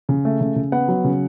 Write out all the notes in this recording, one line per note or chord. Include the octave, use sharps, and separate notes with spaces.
C#3
A3
C#3
C#3
B3 F#5
F#3
C#3